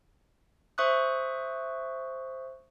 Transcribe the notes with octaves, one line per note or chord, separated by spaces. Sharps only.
C5 E5 C#6 D#6 F#6